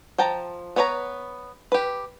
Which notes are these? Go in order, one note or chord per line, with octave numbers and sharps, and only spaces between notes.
F3 G5 A5 A#5
B3 B4 C#5 G5 A#5
G4 B4